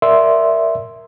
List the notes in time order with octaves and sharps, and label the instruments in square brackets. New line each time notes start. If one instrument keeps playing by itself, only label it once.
[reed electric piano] A#4 D5 E5 C6 E6